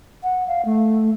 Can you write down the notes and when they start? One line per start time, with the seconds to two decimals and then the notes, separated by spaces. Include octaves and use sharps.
0.23 F#5
0.48 F5
0.65 A3